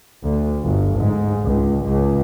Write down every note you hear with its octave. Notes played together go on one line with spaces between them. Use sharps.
D2
G1
G#2
C#2
C#2